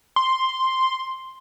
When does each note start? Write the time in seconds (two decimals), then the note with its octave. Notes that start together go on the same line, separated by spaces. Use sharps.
0.16 C6